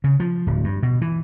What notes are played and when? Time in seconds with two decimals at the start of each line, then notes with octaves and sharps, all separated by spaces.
0.04 C#3
0.20 F3
0.47 D1
0.64 G2
0.83 B2
1.01 E3